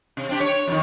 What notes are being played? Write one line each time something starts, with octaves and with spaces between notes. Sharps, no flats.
C3
C4 D4 G4
C#5
F2 D#3